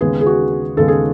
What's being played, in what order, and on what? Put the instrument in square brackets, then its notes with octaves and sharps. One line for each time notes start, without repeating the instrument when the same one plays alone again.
[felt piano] D#2 C#3 G#3 B3 G#4
G#4
F#4
D#2 C#3 G#3 B3 A4
G#4